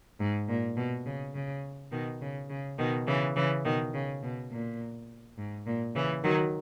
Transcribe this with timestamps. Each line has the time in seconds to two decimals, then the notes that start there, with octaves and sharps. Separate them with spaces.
0.19 G#2
0.48 A#2
0.77 B2
1.05 C#3
1.34 C#3
1.92 B2 D#3
2.21 C#3
2.49 C#3
2.78 B2 D#3
3.06 C#3 E3
3.35 C#3 E3
3.64 B2 D#3
3.93 C#3
4.22 B2
4.51 A#2
5.37 G#2
5.66 A#2
5.95 C#3 E3
6.24 D#3 F#3